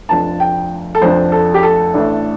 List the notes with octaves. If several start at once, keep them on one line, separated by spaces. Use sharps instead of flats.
F1 F2 F3 D4 A5
G5
A4
F1 F2 F3 D4 C5
A4
G4
A4
A1 A2 A3 D4